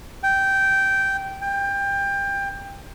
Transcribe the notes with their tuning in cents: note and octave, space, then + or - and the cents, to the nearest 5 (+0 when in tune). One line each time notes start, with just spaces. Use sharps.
G5 -10
G5 +20